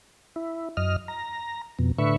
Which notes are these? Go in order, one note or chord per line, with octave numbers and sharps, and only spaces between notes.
E4
F#2 D#5 F6
A#5
F2 B2
A2 D3 B4 E5 C#6